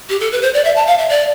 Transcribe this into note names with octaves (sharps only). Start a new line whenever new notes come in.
G4
A4
B4
C5
D5
E5
A5
F5
E5
D5